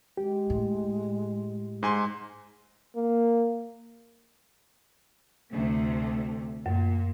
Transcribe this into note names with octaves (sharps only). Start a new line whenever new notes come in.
G#3 G4
A2
G#2 G#5 C6
A#3
D2 C3 A3
F#2 A#2